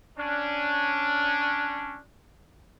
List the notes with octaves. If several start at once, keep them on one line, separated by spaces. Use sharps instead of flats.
C#4 D4